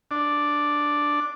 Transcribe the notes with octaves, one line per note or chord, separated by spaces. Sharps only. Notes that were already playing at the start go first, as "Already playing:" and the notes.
D4